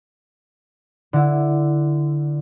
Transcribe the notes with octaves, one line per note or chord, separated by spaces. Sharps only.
D3 E4